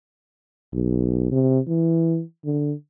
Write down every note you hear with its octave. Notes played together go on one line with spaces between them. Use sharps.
B1
C3
E3
D3